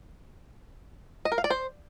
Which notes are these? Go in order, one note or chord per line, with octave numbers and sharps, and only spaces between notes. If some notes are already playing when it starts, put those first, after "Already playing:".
D#5
A#4
F5
D5
C5